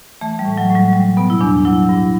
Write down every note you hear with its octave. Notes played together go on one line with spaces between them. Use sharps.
E3 A3
G3
A2
F#3
A2
G3
F#3 G3
B2 B3
E4
E2 D4
F#3 E4
G2